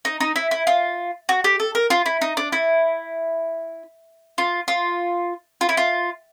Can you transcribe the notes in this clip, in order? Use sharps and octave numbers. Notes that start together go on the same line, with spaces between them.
D#4
D#4
E4
E4
F4
F#4
G4
A4
A#4
F4
E4
D#4
D4
E4
F4
F4
F4
E4
F4